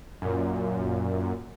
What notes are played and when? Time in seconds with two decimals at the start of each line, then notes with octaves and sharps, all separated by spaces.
0.22 F#2 A#2